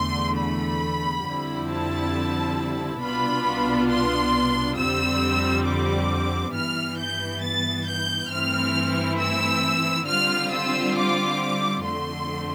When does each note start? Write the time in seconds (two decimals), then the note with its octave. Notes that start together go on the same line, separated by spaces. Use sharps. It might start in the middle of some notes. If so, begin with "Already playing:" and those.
Already playing: E2 D3 A3 C6
0.37 B5
1.26 F2 D3 G3 C4 E4
1.69 A5
3.02 C2 B2 B3 D4 F4 B5
3.90 C6
4.78 F2 D3 G3 C4 E6
5.67 D6
6.54 G2 E3 B3 F6
6.99 G6
7.43 A6
7.87 G6
8.31 G2 E3 A3 C4 E4 F6
9.20 E6
10.08 D3 G3 C4 F4 F6
10.52 E6
10.96 D6
11.84 F2 D3 A3 C6